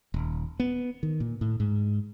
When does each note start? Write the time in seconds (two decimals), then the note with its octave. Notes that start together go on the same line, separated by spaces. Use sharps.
0.14 D#1
0.60 B3
1.03 D#3
1.20 A#2
1.41 A2
1.60 G#2